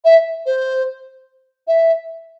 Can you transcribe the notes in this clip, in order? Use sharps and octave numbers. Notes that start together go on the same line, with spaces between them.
E5
C5
E5